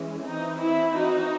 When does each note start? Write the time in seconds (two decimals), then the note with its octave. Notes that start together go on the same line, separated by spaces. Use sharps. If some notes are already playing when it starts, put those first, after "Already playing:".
Already playing: E3 G#3 C#4
0.25 E3 C4 D#4
0.60 E4
0.94 D#4 F#4